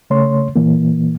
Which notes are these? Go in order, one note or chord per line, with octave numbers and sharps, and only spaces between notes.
C#3 A3 C#5 C6
A#2 E3 A#3